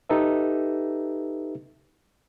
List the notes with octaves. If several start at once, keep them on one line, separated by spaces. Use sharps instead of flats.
D#4 G4 A4 B4 E5